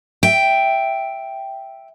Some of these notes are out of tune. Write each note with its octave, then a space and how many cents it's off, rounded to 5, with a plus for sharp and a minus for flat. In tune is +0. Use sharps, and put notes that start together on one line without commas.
E5 +0 G5 +0